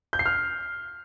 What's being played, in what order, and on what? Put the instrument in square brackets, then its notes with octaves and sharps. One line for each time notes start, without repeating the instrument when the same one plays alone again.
[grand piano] G6
C7
F6